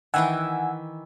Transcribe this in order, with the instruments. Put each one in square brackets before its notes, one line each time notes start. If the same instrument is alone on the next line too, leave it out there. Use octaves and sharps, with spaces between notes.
[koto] D#3 E3 E4 [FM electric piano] F#5 G#5 E6